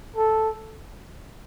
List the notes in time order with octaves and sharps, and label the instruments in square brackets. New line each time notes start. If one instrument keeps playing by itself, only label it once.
[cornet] A4